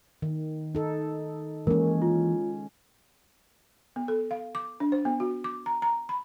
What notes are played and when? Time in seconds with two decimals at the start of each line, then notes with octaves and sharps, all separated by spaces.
0.22 D#3
0.75 D#4 A4
1.67 E3 G#3 A#3 C#4 A#4
2.02 F4
3.96 B3
4.08 A4
4.31 F5
4.55 D6
4.80 D4
4.92 C5
5.05 B3
5.20 F#4
5.44 D6
5.66 A#5
5.82 A#5
6.09 B5